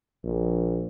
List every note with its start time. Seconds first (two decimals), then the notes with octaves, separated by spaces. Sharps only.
0.24 A#1